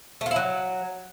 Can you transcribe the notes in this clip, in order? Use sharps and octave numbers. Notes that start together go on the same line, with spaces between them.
A3
F4
E4
F#3